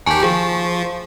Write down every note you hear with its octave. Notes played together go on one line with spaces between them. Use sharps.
D#2 G4 G#5 A5 C#6
F3 G#4